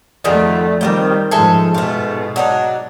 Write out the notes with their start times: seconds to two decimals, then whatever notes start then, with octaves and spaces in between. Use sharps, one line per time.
0.24 F2 D3 D#3 A3 F4
0.81 D#3 G3 C4 F4 G5
1.31 G#2 F3 G#4 A4 E5
1.74 G#2 B2 A3 F4
2.36 F#3 D4 D#4